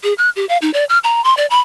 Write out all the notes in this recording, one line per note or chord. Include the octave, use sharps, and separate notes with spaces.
G#4
F#6
G4
F5
D#4
D5
F6
A#5
C6
D5
B5